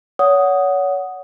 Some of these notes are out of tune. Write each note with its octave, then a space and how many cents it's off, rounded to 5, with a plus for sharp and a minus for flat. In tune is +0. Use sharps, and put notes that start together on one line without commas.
C#5 +30 F#5 +0 D#6 +0